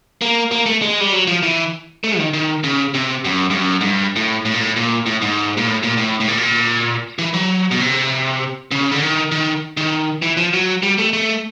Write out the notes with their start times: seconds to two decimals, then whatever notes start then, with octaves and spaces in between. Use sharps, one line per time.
0.21 A#3
0.52 A#3
0.66 A3
0.82 G#3
1.00 G3
1.13 F#3
1.27 F3
1.43 E3
2.04 A3
2.18 D#3
2.33 D#3
2.64 C#3
2.94 C3
3.25 F#2
3.50 G2
3.55 F#2
3.81 G#2
3.85 G2
4.16 A2
4.45 A2
4.54 A#2
4.61 A2
4.76 A#2
5.06 A2
5.22 G#2
5.57 A#2
5.67 A2
5.83 A#2
5.97 A2
6.20 A2
6.28 A#2
6.38 B2
6.43 A#2
7.19 E3
7.34 F#3
7.71 B2
7.80 C3
8.71 C#3
8.91 D3
9.01 D#3
9.32 D#3
9.77 D#3
10.22 E3
10.37 F3
10.53 F#3
10.83 G3
10.99 A3
11.13 A3